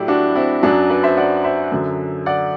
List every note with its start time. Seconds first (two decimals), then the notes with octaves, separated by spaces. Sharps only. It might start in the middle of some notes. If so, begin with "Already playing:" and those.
Already playing: A2 F#3 E4 G4 D5
0.08 D4 F#4
0.36 C4 E4
0.63 F#2 F#3 D4 F#4
0.90 B4 D5
1.03 C5 E5
1.17 D5 F#5
1.44 C5 E5
1.72 F#2 D3 F#3
2.26 D5 F#5